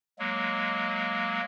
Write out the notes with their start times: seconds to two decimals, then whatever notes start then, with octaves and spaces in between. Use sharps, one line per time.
0.19 F#3 G#3 A#3